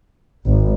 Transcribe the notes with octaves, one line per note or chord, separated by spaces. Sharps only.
G#1